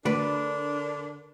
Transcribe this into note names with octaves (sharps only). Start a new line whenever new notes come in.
D2 D3 D4 A#4 B4 D5